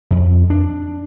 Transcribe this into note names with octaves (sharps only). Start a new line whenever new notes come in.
F2
D4